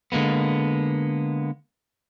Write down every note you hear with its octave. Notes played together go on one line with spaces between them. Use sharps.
D3 G#3 A#3 B3